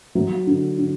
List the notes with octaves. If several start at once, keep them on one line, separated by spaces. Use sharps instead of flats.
F#3
D3
D3